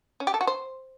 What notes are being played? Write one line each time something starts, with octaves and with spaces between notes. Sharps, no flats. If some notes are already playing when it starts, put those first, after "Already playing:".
C#4
G4
A4
F#4
C5